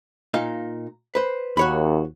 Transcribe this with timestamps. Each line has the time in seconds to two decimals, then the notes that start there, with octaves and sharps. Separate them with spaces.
0.34 A#2 D#4 F5
1.15 B4 C5
1.57 D#2 F#4 C#5 B5